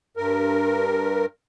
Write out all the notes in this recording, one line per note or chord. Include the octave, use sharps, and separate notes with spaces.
G2 A#4